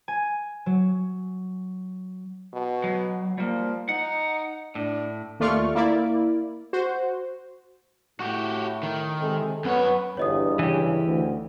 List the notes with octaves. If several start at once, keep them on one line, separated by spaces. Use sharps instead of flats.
G#5
F#3
B2
F#3
F3 G3 A#3
D#4 F#5
A2 D4
D#2 A3 F4 D5 C#6 F6
A#3 E4 D5
F#4 C5
A2 F#4 G4
D#3
C3 G#3 A4
F#2 B3 C#5
G1 E2 G2 C#5 D#5 D#6
C#3 E3 G4
D2